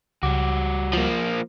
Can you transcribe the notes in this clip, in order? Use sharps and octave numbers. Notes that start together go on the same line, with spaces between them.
C#2 G3 F#4 D6
F3 A#3